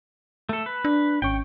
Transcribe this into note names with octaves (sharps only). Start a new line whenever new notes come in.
A3 A4
B4
D4
G#1 C#4 G5 C#6